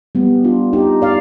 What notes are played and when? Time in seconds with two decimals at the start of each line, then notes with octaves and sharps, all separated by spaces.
0.15 G3 B3
0.44 D4 F4
0.73 D#4 G4
1.02 D5 F5